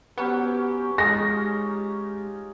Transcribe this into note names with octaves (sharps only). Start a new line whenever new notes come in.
F#3 B3 C#4 G4 C5
G#3 C#4 D#4 F4 G4 A#6